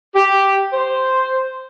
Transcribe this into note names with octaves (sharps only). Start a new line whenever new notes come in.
G4
C5